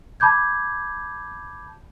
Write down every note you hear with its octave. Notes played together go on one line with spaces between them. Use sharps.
A5 B5 D6 G6 G#6